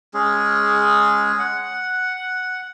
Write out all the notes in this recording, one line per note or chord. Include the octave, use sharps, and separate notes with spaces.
G#3 C#4 G#4
F#5